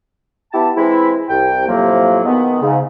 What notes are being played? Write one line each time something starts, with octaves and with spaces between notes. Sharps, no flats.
B3 E4 G4 A5
E3 G#3 C4 E4
C2 G5
A2 C3 F3 F#3 A#3
B2 D#3 G#3 B3
G#2 C#3